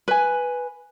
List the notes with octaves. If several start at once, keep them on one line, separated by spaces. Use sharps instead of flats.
B4 G#5